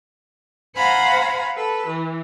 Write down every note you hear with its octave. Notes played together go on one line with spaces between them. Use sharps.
C5 F5 F#5 G#5 A#5 B5
A4 B4
E3